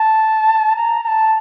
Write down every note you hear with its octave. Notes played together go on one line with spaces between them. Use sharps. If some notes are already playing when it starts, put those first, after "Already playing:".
Already playing: A5
A#5
A#5
A5